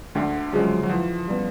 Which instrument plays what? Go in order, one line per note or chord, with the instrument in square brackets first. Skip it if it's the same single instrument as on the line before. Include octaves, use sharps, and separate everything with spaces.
[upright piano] D2 [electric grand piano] D3
[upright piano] C#3 F3 G#3 [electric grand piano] F#3
[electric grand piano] F#3
[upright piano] E3 [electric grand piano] F3
[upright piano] G3 B3